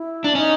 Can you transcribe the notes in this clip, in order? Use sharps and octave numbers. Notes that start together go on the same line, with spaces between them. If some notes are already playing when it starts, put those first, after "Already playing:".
Already playing: E4
D4
C#4 D#4